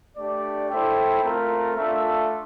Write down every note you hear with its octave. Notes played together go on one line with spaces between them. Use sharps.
A3 D4 G4 D5
E4 A4 C5 E5 G5
A3 C4 F4 A#4
A3 D4 F4 A4 E5